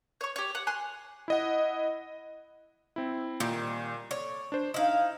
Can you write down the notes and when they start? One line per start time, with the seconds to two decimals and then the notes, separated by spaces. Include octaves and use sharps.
0.21 C#5 C#6
0.36 G4 C#5
0.55 F#5
0.67 G#5 C6 F#6
1.28 E4 D#5 F#5
2.96 C4 E4
3.40 A#2 D#3 G3
4.11 C#5 D5
4.52 D4 C5
4.74 D#4 E4 D#5 F5